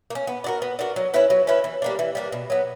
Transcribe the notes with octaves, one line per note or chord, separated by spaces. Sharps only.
A#3
C#4
B3
D4 F#4 A#4
B3
D4 F#4 A#4
F#3
C#4 E4 B4
F#3
C#4 E4 B4
E3
G3 A#3 D4
E3
G3 A#3 D4
B2
F#3 B3